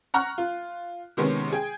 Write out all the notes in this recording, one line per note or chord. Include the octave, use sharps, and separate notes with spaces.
F#5 A#5 C#6 F6 F#6
F4
C3 D#3 G#3 B3 C#4
G#4 G5